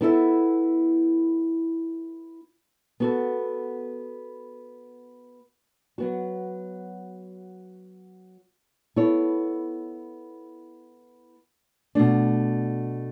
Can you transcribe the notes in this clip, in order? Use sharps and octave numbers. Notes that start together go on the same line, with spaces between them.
B3 E4 A4 E5
B3 F#4 A4
F#3 B3 F#4
B3 E4 A4 C#5
B2 A3 D4